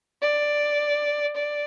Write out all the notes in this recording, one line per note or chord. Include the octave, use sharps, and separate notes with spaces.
D5
D5